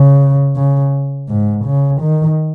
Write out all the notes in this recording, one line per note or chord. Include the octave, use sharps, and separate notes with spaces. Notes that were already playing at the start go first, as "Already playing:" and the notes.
Already playing: C#3
C#3
G#2
C#3
D#3